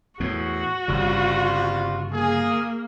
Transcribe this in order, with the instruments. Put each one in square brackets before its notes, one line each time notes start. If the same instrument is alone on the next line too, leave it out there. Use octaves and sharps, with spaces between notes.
[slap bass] E2 A2 [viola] F#4
[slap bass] G1 C#3 [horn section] G3 C4 F4
[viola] A#3 [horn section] G#4